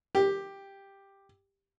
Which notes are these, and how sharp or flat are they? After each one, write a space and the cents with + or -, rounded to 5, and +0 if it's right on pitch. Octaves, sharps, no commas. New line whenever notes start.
G4 +5